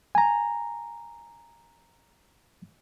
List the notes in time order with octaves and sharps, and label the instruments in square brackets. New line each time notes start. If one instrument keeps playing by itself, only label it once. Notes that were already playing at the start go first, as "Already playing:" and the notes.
[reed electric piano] G#5 A#5